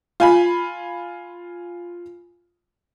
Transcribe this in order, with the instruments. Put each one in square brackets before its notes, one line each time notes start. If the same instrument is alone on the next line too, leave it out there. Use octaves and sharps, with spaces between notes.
[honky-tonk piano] F4 G#5 B5